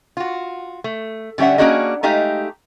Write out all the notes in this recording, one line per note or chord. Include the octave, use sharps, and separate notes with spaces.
F4 F#4
A3
D3 G3 C#4 E5 F#5
A#3 C#4 D4 F#4 G#4 D#5
G#3 A3 D#4 G4 F5